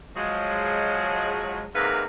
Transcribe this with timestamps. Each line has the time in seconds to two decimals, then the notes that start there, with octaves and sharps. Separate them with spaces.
0.17 F3 F#3 G#3
1.75 G#2 C3 G#3 A#3 B4 F5